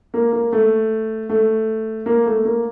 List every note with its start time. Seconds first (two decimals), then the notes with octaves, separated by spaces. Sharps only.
0.14 A#3
0.32 A#3
0.52 A3
1.29 A3
2.06 A#3
2.26 A3
2.45 A#3